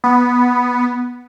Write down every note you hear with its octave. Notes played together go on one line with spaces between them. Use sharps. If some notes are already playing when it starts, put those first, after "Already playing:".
B3